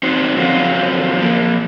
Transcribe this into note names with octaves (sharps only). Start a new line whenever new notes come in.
C4 D#4 F#4 C5
D3 F3 F#3 C4 F4 F#4
F3 A#3